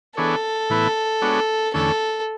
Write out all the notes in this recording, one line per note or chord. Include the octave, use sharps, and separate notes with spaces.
E3 B3 D4 G#4 A4 C#5
A2 E3 B3 E4 B4
G#3 B3 D4 F#4 C#5
E2 D3 A3 C#4 A4